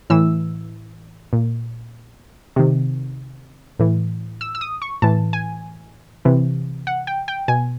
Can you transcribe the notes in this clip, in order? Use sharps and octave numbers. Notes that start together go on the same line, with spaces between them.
A2 E3 E6
A#2
C3 D#3
A2 E3
E6
E6
D#6
C#6
A2 E3 A5
G#5
C3 E3
F#5
G5
G5
B2 G#5